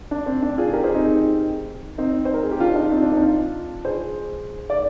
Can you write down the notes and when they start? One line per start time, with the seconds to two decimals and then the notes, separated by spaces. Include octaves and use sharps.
0.11 D4
0.26 C4
0.42 D4
0.58 F4 G#4
0.73 G4 A#4
0.84 G#4 C5
0.94 C4 D#4
1.98 C4 D#4
2.25 C5
2.34 A#4
2.43 G#4
2.51 G4
2.60 D4 F4
2.70 D#4
2.75 D4 F4
2.91 C4 D#4
3.02 D4
3.12 C4 D#4
3.22 D4 F4
3.85 G#4 C5
4.70 D5